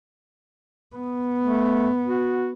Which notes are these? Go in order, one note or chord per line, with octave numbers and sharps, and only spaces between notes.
B3
A3
F#4